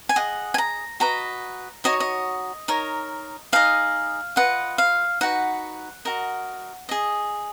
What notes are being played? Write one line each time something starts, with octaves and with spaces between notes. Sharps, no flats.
G#5
G#4 D#5 F#5
G#5
A#5
F#4 B4 D#5 A#5
D#4 F#4 C#5 D#5
D#5
D#4 A#4 C#5
D#4 G#4 B4 D#5 F5
F4 B4 D#5 F#5
F5
D#4 F#4 B4 F#5
F#4 A#4 D#5
G#4 D#5